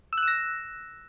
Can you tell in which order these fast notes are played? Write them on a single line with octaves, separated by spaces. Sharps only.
E6 F#6 E7 A#6